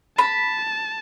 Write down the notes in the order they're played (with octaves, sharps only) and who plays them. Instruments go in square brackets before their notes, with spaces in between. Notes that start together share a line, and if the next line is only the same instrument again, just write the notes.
[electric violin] A5 [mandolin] B5